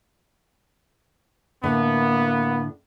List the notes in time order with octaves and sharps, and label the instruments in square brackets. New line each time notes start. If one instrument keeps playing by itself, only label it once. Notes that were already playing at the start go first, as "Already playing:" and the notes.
[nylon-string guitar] A2 D3 [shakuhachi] A#3 [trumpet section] B3